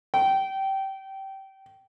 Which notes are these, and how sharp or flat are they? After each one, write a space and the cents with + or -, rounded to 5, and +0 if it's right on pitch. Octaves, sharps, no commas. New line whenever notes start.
G5 -20